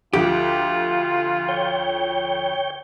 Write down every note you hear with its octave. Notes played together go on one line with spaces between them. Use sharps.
D2 F3 F4 G4
C#5 G5